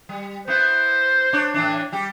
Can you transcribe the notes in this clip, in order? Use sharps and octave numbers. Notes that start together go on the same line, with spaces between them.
G3
B3 E4 C5
D4 C#5
A2 E3 D4
G3 G4